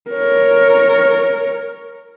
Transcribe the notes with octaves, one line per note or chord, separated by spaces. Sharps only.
A#4 C#5